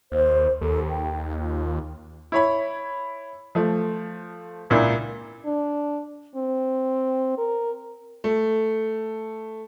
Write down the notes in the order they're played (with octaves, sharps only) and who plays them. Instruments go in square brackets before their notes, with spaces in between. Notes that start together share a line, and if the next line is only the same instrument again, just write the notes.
[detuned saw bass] D#2 [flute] C5
[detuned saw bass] D#2 [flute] A4
[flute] G5
F4
[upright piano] E4 C#5 B5
F3 A3
C#2 A#2 D4 E4
[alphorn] D4
C4
A#4
[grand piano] A3